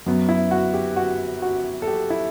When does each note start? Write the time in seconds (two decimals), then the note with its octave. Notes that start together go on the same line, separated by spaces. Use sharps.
0.06 F#2 F#3 B3
0.29 E4
0.51 F#4
0.74 G4
0.96 F#4
1.42 F#4
1.82 A4
1.87 G4
2.10 E4